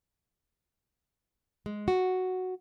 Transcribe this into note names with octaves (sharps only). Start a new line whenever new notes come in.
G#3
F#4